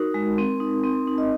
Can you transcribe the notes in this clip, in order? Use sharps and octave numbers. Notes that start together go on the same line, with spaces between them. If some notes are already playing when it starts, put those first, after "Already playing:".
Already playing: D#4 F#4 A#4
G#3
C4
D#4
C4
D#4
D#5